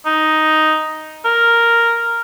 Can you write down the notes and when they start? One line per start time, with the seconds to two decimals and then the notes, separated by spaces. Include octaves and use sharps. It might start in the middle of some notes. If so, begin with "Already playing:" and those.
0.06 D#4
1.25 A#4